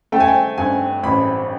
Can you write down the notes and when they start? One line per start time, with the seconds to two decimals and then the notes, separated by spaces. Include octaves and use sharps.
0.12 A3 G5
0.20 G#5
0.28 G5
0.58 G2 G#5
1.03 A1 B5